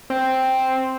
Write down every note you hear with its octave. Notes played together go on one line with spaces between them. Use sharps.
C4